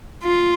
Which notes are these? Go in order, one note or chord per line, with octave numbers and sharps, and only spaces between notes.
F4